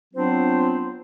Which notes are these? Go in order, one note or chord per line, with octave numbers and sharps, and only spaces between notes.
F#3 B3 C4 D4 F4 C5